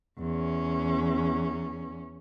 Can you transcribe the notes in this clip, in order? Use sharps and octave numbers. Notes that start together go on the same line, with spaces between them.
E2 C#4